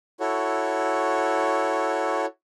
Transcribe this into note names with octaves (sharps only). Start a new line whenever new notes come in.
E4 F#4 A4 C#5